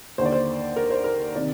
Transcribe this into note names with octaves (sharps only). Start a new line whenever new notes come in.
D#2 D3 C5 D5
C5
A#4
C5
A#4
C3 D#3 D5